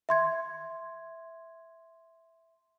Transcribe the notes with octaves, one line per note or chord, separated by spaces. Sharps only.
E5 C6 G#6